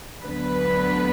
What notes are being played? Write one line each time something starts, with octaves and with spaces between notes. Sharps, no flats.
D2 D3 F#3 B3 D4 B4